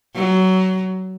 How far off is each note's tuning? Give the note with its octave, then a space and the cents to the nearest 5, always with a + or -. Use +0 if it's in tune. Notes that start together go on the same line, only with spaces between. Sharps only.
F#3 +20